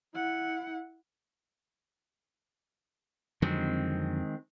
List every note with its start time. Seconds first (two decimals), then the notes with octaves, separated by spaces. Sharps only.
0.14 E4 F#5
3.42 F2 D3 D#3 F#3 G#3 C4